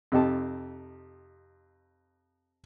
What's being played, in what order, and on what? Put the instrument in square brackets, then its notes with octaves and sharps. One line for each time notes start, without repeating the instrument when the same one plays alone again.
[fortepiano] F2 C3 D#4 G4 A5